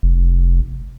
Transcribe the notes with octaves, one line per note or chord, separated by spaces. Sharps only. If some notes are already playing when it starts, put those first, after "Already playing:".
F1